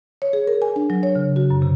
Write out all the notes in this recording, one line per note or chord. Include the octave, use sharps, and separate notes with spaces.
C#5
G#4
A#4
G#5
D4
F#3
C#5
C#3
F#4
F#2
C3